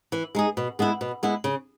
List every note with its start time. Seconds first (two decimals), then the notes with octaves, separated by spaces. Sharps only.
0.12 E3
0.35 G#3 D#4 G#4
0.57 B2
0.79 G#3 B3 E4
1.01 B2
1.23 G#3 B3 E4
1.44 C#3